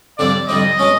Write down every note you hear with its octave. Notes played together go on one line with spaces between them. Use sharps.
F2 D3 G3 C4 D5
F2 D3 G3 C4 D#5
B2 G#3 C#4